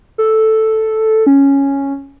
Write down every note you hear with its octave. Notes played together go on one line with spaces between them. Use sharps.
A4
C#4